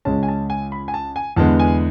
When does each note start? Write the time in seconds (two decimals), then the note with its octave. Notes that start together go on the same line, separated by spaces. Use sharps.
0.05 C#2 C#3 G#3 C#4 A5
0.23 G#5
0.28 A5
0.50 G#5
0.72 B5
0.88 G#5
0.94 A5
1.16 G#5
1.36 E2 D3 G#3 B3 A5
1.60 G#5